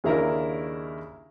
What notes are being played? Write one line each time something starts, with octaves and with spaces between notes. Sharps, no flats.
D#2 C#3 D4 E4 A#4 A#5